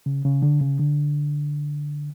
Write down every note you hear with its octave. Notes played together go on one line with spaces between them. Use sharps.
C#3
C#3
D3
C#3
D3